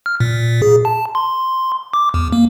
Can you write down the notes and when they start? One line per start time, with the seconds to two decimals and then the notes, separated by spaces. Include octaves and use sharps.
0.06 F6
0.20 A#2
0.62 G#4
0.85 A5
1.15 C6
1.93 D6
2.14 E2
2.32 A#3